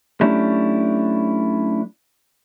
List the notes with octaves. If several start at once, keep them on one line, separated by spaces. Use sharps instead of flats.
F#3 A3 C#4 D4 E4 G4